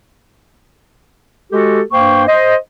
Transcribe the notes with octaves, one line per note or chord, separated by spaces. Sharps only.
G#3 F#4 G4 A4
G2 A#3 C5 G5 C#6
C5 D#5